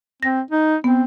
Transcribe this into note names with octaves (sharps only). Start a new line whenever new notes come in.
C4 A#6
D#4
B3 C4